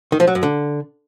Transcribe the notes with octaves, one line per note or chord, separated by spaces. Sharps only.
D#3
F3
F#3
F#2
D3